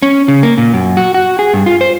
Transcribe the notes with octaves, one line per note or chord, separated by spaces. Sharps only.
C#4
C#3
A#3
A#2
F#2
F#4
F#4
G#4
G2
F4
C5